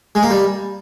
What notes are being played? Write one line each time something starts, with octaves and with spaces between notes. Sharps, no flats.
G#3
A#3
G3